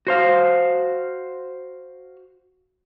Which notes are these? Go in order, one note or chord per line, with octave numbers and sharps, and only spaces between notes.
F#4 C5 F5